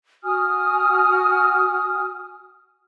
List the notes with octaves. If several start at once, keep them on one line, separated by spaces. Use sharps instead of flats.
F#4 G#5 D#6 F6